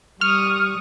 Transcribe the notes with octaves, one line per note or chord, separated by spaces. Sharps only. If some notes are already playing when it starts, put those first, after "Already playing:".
G3 C#6 D#6 F6